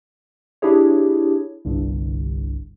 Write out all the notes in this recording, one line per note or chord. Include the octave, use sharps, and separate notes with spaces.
D4 E4 G4 G#4 C#5
G1 C2 G2